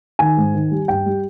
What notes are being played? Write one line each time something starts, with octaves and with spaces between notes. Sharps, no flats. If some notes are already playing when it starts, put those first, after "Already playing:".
D#3 G#5
G#2
D#3
G3
G2 G5
G3